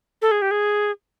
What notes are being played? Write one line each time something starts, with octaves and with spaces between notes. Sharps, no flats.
A4
G#4
G4
G#4